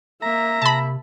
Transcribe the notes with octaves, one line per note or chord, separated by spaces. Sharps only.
A#3 E5 A#5
C3 A5 B5